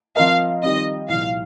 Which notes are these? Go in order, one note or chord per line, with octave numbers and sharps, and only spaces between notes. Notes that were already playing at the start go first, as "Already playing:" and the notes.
F3 C4 F4 A#4 D#5 F5
D#3 G3 C4 F4 D#5
C2 A#2 F3 F5